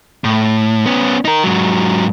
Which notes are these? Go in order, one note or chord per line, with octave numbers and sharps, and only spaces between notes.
A2
B3 C#4
D#4 A#4
G#2 F#3